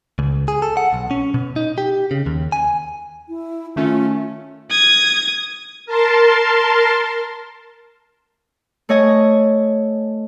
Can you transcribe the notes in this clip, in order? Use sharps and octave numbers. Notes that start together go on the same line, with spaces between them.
C#2
G#4
A4
F#5
B1
C#4
B2
D#4
G4
C#3
D#2
G#5
E4
D#3 A3 C#4 F4
D#6 G#6
A#4 A5 C6
A3 C#5 D#5 G#5